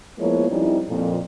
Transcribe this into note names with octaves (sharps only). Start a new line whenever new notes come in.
F3 G#3 A#3 B3 E4 C#5
F2 G3 C#4 D#4 E4
F2 A#2